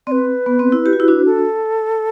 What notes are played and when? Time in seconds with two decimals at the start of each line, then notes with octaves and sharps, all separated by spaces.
0.07 C4 D5
0.11 B4
0.46 B3
0.59 C4
0.72 E4
0.86 G4
0.93 F#4
1.00 E4
1.08 D4 F#4
1.25 A4